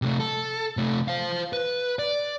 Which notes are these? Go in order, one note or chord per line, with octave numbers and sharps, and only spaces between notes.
C3 A3
A4
C3 A3
C5 F5
B4
D5